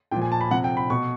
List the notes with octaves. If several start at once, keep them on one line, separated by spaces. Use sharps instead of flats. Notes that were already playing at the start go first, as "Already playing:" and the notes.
A#2 F3 G5
G#5
A5
B5
C3 F3 F#5
G5
B5
B2 C#6